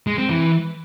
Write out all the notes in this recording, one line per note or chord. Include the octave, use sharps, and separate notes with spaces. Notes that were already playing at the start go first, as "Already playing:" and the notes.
G#3
C4
E3